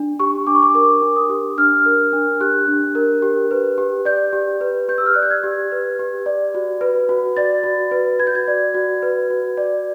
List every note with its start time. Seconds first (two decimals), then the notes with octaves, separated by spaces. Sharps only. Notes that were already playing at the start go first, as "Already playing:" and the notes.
Already playing: D4
0.20 G4 C#6
0.47 D4 D6
0.55 C#6
0.63 D6
0.75 A#4 D6
1.02 D4
1.16 D#6
1.29 G4
1.58 D4 F6
1.86 A#4
2.13 D4
2.40 G4 F#6
2.68 D4
2.95 A#4
3.22 G4
3.51 B4
3.78 G4
4.05 D5 G6
4.33 G4
4.61 B4
4.89 G4 G6
4.98 E6
5.06 F6
5.14 D5 F#6
5.23 G6
5.30 G#6
5.44 G4
5.72 B4
5.99 G4
6.26 D5
6.55 F#4
6.81 B4
7.09 F#4
7.37 D5 A6
7.64 F#4
7.91 B4
8.19 F#4 G#6
8.27 G6
8.35 G#6
8.48 D5
8.75 F#4
9.02 B4
9.30 F#4
9.57 D5